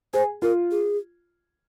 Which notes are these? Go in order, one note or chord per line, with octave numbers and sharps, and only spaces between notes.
G#4 C5
F4 A#4
G#4